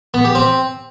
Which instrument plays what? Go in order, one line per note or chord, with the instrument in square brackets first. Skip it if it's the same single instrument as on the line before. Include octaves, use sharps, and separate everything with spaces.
[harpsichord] B3
G4
C4